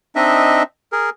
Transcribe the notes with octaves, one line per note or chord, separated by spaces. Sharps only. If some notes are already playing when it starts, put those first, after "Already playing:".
C4 D4 D#4 D#5 E5
G#4 A#4